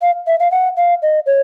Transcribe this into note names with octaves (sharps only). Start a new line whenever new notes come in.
F5
E5
F5
F#5
F5
D#5
C#5